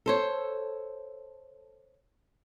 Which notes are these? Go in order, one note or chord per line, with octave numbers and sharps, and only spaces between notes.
A4 C5 C#5